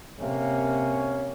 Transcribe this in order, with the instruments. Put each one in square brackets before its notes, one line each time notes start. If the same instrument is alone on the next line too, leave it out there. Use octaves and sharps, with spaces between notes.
[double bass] C3 A#3 [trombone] C#4